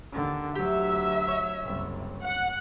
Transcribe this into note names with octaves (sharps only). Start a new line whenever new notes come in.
D#2 D3
D2 F#3 G4 E5
C#5
F#1 C2
F#5